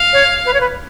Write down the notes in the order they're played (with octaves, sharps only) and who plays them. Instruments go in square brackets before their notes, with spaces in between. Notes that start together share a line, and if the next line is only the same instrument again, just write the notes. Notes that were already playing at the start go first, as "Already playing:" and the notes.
Already playing: [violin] F5
[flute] C#5
B4
C#5
B4